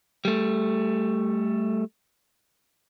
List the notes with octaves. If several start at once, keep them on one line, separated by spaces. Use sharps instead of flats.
G3 A3